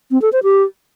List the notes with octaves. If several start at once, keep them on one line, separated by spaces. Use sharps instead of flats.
C4
A4
C5
G4